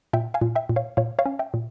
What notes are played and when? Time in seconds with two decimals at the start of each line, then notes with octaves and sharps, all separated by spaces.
0.13 A#2 E5 G5
0.34 F5 G#5
0.41 A#2
0.55 E5 G5
0.69 A#2
0.76 C#5 F5
0.97 A#2 C#5 F5
1.19 C#5 F5
1.26 C#4
1.39 E5 G5
1.54 A#2